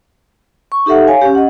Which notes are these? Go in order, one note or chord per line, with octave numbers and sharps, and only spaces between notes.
C#6
D#4 G4 A4 E5 F#5
C#5 F5 G#5
C#4 G4
D#5 F#5